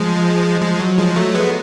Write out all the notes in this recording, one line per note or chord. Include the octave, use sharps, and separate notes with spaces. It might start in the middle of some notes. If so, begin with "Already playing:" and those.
Already playing: F3 G#3
F3 G#3
F#3
F3 G#3
F#3 A3
G#3 B3